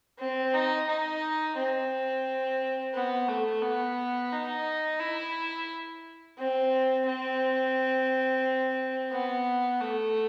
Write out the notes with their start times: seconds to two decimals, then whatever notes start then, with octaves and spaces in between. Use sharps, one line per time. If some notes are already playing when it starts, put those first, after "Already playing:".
0.19 C4
0.54 D#4
0.87 D#4
1.57 C4
2.94 B3
3.28 A3
3.62 B3
4.32 D#4
5.00 E4
6.38 C4
7.06 C4
9.12 B3
9.81 A3